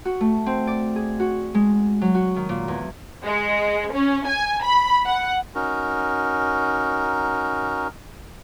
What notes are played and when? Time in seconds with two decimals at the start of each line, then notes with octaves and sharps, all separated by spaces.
0.05 F#4
0.21 A3
0.46 C4
0.67 D5
0.96 G#4
1.20 F#4
1.55 G#3
2.01 F#3
2.15 F#4
2.36 D#3
2.49 A#2
2.68 E2
3.23 G#3
3.93 C#4
4.26 G#5
4.64 B5
5.05 F#5
5.55 C#4 D#4 F#4 A#4